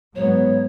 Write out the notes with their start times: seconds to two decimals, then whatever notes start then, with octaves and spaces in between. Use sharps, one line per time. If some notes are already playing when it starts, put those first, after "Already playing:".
0.15 G#2 F#3 B3 C#5